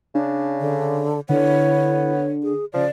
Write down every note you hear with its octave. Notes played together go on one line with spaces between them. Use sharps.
C#3 D4
D3
D3 B3 E4 C#5
G#4
C#3 F3 D5